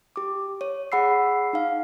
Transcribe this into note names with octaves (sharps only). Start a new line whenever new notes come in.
G4 D6
C#5
G#4 F#5 B5 E6 C7
D#4 F5